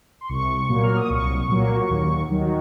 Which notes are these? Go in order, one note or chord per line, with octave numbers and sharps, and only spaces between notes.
C6
C2 C#6
A#2 F#3 A#3
F6
D#6
C2 C#6
A#2 F#3 A#3
D#2
D#3 F#3